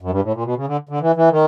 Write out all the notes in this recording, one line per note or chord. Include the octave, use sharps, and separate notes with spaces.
F#2
G2
A2
A#2
B2
C#3
D3
D3
E3
E3
D#3